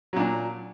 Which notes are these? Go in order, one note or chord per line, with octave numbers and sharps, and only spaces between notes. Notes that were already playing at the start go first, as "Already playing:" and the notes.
A#2 F#3 D4